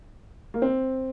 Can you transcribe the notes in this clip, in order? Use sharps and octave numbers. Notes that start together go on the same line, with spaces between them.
A#3
C4